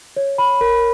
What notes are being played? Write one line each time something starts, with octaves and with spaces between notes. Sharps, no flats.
C#5
B5
A#4